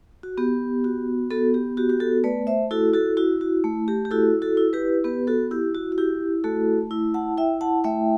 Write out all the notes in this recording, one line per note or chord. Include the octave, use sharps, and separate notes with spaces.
F#4
B3 G4
F#4
B3 F#4 A4
G4
F#4 G4
G4
F#4 A4
A3 B4 D5
C5 E5
E4 F#4 A4
F#4 A4
E4 F#4
F#4
A3
G4
G4
E4 F#4 A4
F#4 A4
E4
G4 B4
B3 G4 B4
F#4 A4
E4 G4
F#4
F#4
E4 G4
A3 F#4 A4
E4
F#5 A5
E4 E5 G5
F#5 A5
A3 E5 G5